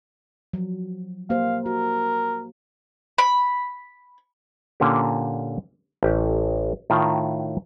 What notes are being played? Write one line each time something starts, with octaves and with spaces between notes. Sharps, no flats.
F3 F#3
A#3 G4 C5 F5
F#4 A#4
B5
A#2 D3 A#3 C#4 G4
A1 G4
A2 D#3 F4 G5 A#5